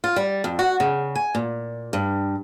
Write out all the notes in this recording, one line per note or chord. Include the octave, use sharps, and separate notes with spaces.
F4
G3
F2
F#4
C#3
G#5
A#2
G2